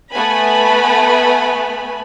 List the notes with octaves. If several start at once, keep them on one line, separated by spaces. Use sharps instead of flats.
A3 B3 B4 G#5 B5